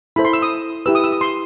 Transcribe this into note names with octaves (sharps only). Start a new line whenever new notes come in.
E4 A4 C5 B5
C6
E6
D#6
E4 G4 B4 E6
D#6
E6
D#6
C6